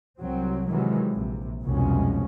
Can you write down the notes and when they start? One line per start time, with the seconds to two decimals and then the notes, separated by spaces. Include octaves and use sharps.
0.19 C2 F#3 C4
0.68 C3 D#3 E3 F#3 G#3
1.10 A#1 C3
1.64 C2 F2 B2 G#3 C#4